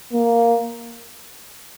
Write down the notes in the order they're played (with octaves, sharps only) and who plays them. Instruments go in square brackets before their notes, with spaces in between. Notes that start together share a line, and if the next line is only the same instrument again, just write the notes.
[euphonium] A#3